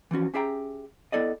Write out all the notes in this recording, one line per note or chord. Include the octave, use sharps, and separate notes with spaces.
E3 F3 C#4 F#4
C#4 G4 G#4 E5 G5 A#5
B3 E4 A4 D5 D#5